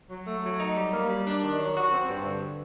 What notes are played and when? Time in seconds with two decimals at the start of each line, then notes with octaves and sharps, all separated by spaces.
0.10 F#3
0.26 A3
0.44 F#3
0.60 D#4
0.76 G3
0.93 A#3
1.09 G3
1.26 D4
1.43 D#3
1.59 F#3
1.75 F#4
1.93 C4
2.09 G2
2.25 D3